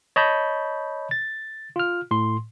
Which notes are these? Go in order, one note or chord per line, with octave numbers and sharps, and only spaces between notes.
C#5 D#5 A5 B5 G6
A6
F4 F6
A2 C6